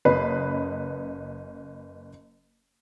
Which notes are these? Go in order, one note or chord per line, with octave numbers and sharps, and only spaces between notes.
F#1 C#4 B4 D#5 B5 C7